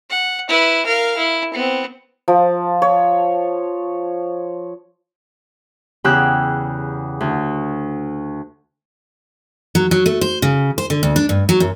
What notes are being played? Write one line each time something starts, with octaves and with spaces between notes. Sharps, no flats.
F#5
E4 B4
A#4 F5
E4
B3 C4
F3
C#5
E2 C#3 G4 G5 E6 F#6
D2
F#3
F#3
A3
C5
C#3
C5
D3
D2
D4
G2
F#3
F#2